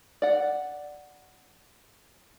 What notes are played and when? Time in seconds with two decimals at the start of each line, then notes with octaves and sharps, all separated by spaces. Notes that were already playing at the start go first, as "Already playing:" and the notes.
0.22 D5 F#5